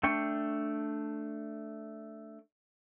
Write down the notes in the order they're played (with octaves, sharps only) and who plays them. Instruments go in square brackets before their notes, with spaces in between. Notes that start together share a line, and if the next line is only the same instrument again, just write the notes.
[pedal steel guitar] A3 D4 G5 C#6